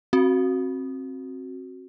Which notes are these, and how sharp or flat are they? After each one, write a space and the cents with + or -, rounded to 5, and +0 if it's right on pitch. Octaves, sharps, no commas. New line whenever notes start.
C4 +25 F#4 +0